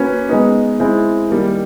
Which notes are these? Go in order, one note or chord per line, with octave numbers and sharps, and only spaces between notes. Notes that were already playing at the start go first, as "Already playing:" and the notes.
Already playing: A#3 C#4 F#4 B4
G#3 B3 D#4
G#3 C4 E4
D#3 G3 A#3